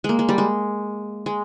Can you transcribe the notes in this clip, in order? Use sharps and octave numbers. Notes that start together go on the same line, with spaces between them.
G#3 A#3
G#3
G3
G#3
G#3